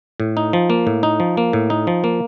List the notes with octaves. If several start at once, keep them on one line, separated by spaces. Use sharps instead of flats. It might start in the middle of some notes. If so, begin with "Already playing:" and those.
A2
D#4
F3
A#3
A2
D#4
F3
A#3
A2
D#4
F3
A#3